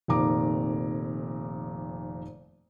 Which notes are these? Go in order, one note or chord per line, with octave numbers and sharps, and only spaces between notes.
F1 F2 A#2 D#3 A#5 D6